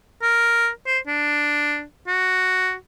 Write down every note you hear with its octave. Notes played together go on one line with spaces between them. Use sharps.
A#4
C5
D4
F#4